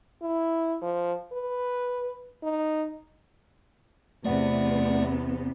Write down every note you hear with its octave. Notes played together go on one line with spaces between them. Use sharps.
E4
F3
B4
D#4
E2 C3 A3 B3 D5 F#5